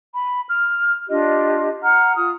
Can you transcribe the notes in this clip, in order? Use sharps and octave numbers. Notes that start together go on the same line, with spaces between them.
B5
F6
D4 F4 G4 D#5
F#5 A#5 F6
F4 D#6